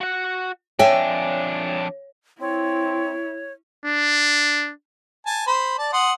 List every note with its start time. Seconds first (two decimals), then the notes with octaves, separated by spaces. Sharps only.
0.01 F#4 F#5
0.79 F2 D4 C#5 E5 G5 G#5
2.41 C4 E4 C#5
3.85 D4
5.26 G#5 A5
5.47 C5 B5
5.78 D5 A5
5.93 F#5 C6 D#6